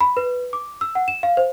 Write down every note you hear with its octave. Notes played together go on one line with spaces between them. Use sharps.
B5
B4
D6
E6
F#5
E7
F5
C5